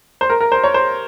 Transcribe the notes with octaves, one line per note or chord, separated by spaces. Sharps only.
C5
A#4
A#4
C5
C#5
C5